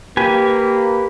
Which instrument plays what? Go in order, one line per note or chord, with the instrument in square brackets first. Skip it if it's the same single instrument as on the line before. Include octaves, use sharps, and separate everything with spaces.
[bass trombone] A#3 [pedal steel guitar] G4 B4 G#5